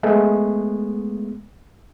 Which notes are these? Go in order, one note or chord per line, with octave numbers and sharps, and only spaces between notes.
G#3 A3 B3